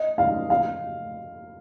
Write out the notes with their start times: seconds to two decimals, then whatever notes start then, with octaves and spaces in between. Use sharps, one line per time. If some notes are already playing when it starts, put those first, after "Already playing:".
Already playing: D#5
0.18 F5
0.50 F5